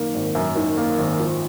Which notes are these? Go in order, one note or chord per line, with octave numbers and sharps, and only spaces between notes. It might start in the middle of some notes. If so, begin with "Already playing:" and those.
Already playing: F#2 D#3 A#3
G#1
F#2
D#3
A#3
G#1
F3